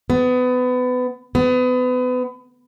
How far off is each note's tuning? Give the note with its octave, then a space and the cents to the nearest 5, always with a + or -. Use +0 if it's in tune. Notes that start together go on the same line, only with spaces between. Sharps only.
B3 +25
B3 +30